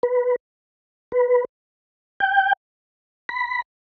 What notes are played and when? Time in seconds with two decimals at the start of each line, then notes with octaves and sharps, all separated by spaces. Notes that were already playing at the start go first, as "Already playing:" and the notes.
0.03 B4
1.12 B4
2.20 G5
3.29 B5